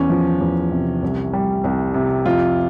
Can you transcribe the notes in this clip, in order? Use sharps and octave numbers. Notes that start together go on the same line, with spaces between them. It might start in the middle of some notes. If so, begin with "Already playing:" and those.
Already playing: E2 C#4
F3
E2
C3
C2
G3
C2
C3
F2 F4